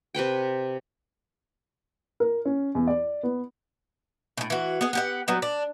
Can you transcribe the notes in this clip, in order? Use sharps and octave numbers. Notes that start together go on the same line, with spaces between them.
C3 B4 C5 G5
A#4
C#4
E2
D5
B3
A2 C#3
E3 F#4
B3 G#4
B3 G4 F#5
F#3 G3 B3
D4